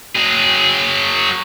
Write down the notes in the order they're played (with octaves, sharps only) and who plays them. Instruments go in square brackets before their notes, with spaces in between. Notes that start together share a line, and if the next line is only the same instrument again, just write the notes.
[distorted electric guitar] F#3 G#4